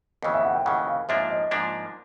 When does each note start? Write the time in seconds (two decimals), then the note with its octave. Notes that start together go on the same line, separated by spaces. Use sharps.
0.23 D#2 C#3 E3 D#5
0.34 E5
0.45 F#5
0.55 G5
0.65 D#2 C#3 E3 F#5
0.87 F5
1.09 G#2 F3 A#3 D4 E5
1.30 D#5
1.51 G#2 F3 A#3 D4